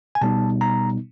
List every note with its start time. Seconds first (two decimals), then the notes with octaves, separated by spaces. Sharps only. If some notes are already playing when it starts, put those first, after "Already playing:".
0.15 G#5
0.21 B2 G3 B3 D#4 A5
0.61 A#5